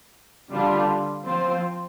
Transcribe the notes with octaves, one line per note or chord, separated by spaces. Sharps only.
D3 G3 D4 F4
F3 C4 F4 C5